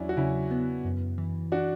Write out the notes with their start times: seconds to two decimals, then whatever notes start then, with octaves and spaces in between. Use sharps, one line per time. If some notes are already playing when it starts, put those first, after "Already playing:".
Already playing: E2 F#3 C#4 D4 E4
0.09 F#4
0.17 C#3 C#4 E4
0.51 B3
0.85 F#2
1.18 E3
1.52 D4 F#4